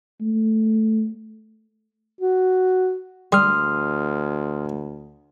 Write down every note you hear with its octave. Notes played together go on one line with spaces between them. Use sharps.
A3
F#4
D2 G3 C6 D#6 F6